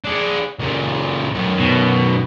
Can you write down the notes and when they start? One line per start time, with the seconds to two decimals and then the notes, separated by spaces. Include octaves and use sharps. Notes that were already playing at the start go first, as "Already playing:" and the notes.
0.04 D4 G#4
0.59 C#2 A#2
1.34 F#2 D#3
1.60 B2